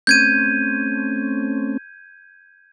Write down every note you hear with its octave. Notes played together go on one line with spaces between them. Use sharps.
A3 C4 C#4 G6 G#6 D#7